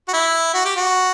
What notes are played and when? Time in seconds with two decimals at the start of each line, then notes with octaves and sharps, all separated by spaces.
0.08 F#4
0.13 E4
0.54 F#4
0.65 G4
0.76 F#4